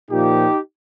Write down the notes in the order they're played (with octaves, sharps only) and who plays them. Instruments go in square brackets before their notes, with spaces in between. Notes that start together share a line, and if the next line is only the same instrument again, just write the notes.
[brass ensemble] A#2 F3 D#4 G4